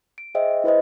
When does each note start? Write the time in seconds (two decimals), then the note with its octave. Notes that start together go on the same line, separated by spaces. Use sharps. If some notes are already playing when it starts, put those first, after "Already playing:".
0.18 D7
0.35 G#4 C5 D#5 E5 G5
0.64 E4 B4 C5 D#5